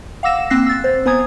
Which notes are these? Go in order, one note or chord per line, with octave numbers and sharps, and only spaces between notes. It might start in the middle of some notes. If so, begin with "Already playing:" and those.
F5 F#5 D6 E6 A#6 E7
A#3 C4 E6 F#6 A#6 C7
E6 A6
C5
B3 C5 G#5 A#5 D#6 G#6